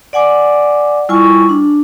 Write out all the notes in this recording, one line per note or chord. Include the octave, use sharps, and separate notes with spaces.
D5 F#5 G#5 D6
G3 E4 F4 G#5 C#6
D4